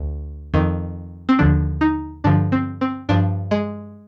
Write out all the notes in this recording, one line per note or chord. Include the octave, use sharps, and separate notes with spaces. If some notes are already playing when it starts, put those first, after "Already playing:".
Already playing: D2
F2 D#3
C4
D#2 D3 F3 D4
D#4
G2 D3 F3 D4
C4
C4
G2 F3 D4
G#3